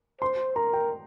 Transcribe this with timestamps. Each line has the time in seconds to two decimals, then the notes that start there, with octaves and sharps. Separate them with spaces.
0.21 C5 C6
0.56 A#4 A#5
0.73 G5